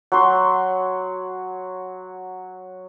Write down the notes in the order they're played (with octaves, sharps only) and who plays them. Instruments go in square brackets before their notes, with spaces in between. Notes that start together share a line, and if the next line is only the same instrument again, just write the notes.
[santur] F#3 C6